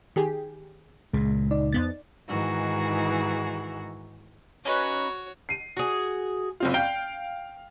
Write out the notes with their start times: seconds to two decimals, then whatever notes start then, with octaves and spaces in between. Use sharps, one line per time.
0.16 D#3 G4 G#4
1.13 C#2 A#2 G#3
1.51 D#4 D5
1.73 F2 B3 A6
2.28 G#2 D#3 E3 F#4 G#4
4.65 C#4 D#4 F#4 B4 C#5
5.49 C7 D#7
5.77 F#4 G#4
6.60 F#1 C4 F4
6.74 F5 G5